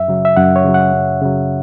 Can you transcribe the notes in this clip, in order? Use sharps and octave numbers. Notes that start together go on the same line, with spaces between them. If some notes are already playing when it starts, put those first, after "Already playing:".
Already playing: F#2 E5
C#3 F#3
E5
F#2 F#5
C#5
C#3 F#3
F#5
F#2
C#3 F#3